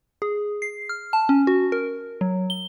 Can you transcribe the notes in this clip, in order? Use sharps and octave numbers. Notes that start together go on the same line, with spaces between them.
G#4
C7
F6
A5
C#4
F#4
A#4
F#3
G7